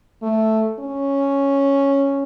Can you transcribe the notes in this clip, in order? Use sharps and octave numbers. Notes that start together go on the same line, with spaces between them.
A3
C#4